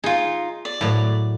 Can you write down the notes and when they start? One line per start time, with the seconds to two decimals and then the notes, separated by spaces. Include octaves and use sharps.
0.04 D#4 F4 G#4
0.65 D5
0.81 A2 F#3